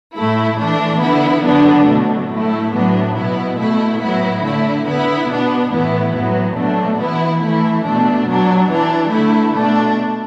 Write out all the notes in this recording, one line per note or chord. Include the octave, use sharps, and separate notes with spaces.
A2 A3 E4
E3 A3 D4
D3 B3 E4
D3 F#3 B3 D4
B2 F#3 A3
A2 A3 E4
A2 F#3 B3 D4
B2 B3 E4
B2 A3 E4
A2 F#3 B3 E4
D3 A3 E4
D3 B3 E4
B2 B3 D4
A2 E3 B3 E4
A2 F#3 B3
B2 F#3 A3 D4
E3 B3 E4
E3 A3 E4
B2 A3 D4
B2 F#3 D4
E3 D4
D3 A3 E4
B2 A3 D4